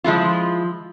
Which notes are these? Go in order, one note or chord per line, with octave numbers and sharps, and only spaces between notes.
F3 G#3 E4 F4